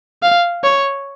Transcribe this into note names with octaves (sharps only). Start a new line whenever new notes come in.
F5
C#5